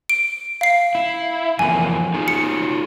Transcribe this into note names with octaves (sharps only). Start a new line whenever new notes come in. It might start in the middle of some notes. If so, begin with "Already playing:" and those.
D7
F5 C7
E4
F2 E3 A#3 G#5
D#4 F4 G#4
C#7